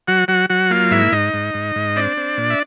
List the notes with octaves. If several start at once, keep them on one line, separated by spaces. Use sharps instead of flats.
F#3 F#4 F#5
F#3 F#4 F#5
F#3 F#4 F#5
A#3 F4 F5
G#2 E4 E5
G#2 D#4 D#5
G#2
G#2
G#2
C4 D4 D5
C4
A#2
E5